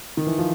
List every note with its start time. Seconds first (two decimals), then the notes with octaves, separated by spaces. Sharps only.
0.17 D#3
0.27 E3
0.38 F3